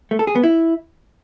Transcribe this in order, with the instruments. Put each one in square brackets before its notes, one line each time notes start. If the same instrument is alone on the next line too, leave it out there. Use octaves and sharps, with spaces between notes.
[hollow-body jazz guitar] A3
A4
G#4
B3
E4